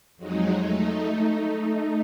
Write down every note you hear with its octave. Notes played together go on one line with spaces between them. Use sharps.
F2 F#3 G#3 D#4
A3 D#4